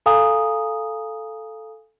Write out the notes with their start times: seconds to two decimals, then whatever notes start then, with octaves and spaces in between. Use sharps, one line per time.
0.06 A4 F5 G#5 A#5 D#6